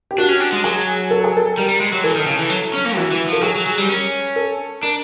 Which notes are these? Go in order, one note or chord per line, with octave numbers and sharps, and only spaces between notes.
G4
D4 F#4
C#4
D4
G#3
F#3 G#4
A4
G#4
A4
G3 A#4
G3
G#3
F#3
E3 A4
D#3
C#3
E3
F#3
C#4
A#3
E3 F#4
E3
F3 A4
F#3 G#4
F#3
F#3
G3
C#4 A#4
A4
D4 A#4